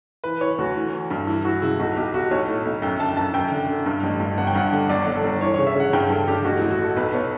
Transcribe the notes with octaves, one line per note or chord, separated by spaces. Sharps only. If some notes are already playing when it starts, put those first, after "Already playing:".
E3 B4
E3 C#5
D2 F#4
E3
E3
G2
E3 E4
E3 F#4
C#3 E4
B1 F#4
B1 G4
B1 F#4
B1 C#5
A2
B1
F#2 G5
D3 A5
F#2 A5
F#2 G5
D3
D3
G2
A1
G2
G1 F#5
G5
G2 F#5
D3
G1 D5
G1
A4
G1
E3 C#5
C#3 C#5
E5
C#3 F#5
G2 G5
G2 A4
D3 G4
A1 F#4
A1 E4
F#4
A2 A4
B1 B4
B2 C#5